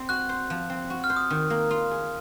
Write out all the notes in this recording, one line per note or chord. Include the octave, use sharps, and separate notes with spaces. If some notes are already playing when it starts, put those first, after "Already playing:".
Already playing: C4
F#4 F#6
C5
F3
C4
F#4
F6
C5
D#6
D#3
A#3
F4
G#4